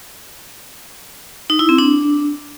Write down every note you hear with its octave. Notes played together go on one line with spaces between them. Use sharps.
D#4
E4
C4
D4